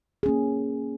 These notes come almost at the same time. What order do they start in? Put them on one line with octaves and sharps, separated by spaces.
G#4 C#4 A#3